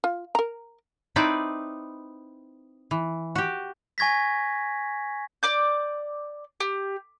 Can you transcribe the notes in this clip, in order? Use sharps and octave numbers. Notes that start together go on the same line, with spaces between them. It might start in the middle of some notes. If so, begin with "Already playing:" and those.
F4
A#4 A#5
C4 D#4 E4 B4 D5
E3
F#4 G4
G#5 C#6 G#6 A#6 B6
D5 D6 G6
G4